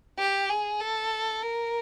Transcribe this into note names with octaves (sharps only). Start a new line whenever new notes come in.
G4
G#4
A4
A#4